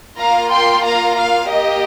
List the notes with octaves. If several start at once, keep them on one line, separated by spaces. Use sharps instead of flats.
A#3 F4 F5 A#5
G5 C6
F5 A#5
F5
A#3 G4 D#5